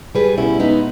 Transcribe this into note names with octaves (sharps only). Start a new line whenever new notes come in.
G3 G#4 B4
B2 C#4 E4
G#3 B3 D#4